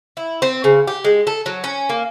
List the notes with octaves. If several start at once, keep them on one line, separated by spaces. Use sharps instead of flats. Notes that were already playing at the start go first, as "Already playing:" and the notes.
E4
C4
C#3
G4
G#3
A4
F#3
C#4
A#3